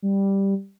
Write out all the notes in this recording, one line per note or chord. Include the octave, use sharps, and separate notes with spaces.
G3